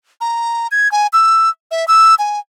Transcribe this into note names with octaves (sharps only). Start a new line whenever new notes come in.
A#5
G#6
G#5
E6
E5
E6
G#5